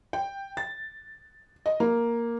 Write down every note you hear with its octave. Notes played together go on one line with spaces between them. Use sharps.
G5
A6
D#5
A#3